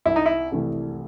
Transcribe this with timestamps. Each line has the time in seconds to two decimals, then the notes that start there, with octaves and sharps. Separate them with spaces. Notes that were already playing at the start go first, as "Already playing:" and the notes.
0.05 C2 E4
0.16 D#4
0.26 E4
0.52 C3 E3 A3